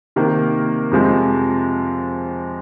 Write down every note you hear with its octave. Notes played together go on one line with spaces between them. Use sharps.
C3 D#3 A#3
F2 C3 F3 G#3